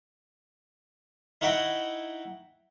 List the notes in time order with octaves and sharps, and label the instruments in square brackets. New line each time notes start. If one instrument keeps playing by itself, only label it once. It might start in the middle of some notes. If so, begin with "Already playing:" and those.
[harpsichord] D#4 E4 F#4 F#5 G5 B5